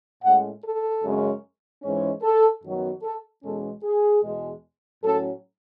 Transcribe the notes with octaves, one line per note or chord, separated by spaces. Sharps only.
A2 G#3 C#4 F#5
A4
F#2 C#3 G#3 C#4
G#2 E3 G#3 C#4
A4
F#2 D#3 F#3 B3
A4
E2 B2 G#3 C#4 A4
G#4
E2 B2 G#3
A2 F#3 C#4 A4